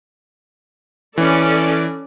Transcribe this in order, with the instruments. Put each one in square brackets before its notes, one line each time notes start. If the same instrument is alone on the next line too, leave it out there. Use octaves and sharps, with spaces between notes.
[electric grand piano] E3 [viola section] C#4 A4 D5